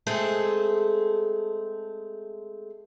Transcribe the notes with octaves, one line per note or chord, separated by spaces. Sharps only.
G#3 A3 C4 G#4 A4